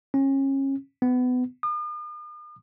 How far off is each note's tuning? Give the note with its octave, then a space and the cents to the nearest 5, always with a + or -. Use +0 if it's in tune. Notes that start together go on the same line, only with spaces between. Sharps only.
C#4 -30
B3 +25
D#6 -45